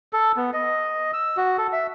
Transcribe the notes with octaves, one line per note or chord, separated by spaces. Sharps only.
A4
B3
D#5
E6
F#4
A4
E5